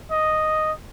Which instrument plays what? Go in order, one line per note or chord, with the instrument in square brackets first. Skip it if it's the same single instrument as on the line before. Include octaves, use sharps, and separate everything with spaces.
[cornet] D#5